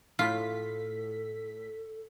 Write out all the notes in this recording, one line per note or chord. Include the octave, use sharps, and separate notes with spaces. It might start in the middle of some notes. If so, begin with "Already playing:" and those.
A2 F4 A4 B6